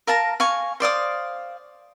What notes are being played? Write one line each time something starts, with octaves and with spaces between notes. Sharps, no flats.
A#4 F5 A5 A#5
F5 G#5 C#6
C5 D5 F5 D#6